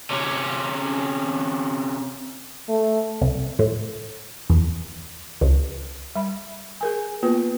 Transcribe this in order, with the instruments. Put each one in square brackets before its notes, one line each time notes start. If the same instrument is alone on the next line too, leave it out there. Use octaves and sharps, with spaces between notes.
[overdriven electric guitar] C3 C#4
[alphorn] A3
[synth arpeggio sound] C2
A2
E2
C#2
[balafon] G3 B5
G#4 A#4 G#5
A#3 B3 F4 B4